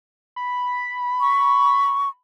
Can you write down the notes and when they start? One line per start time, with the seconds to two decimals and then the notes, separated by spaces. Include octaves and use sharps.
0.36 B5
1.21 C#6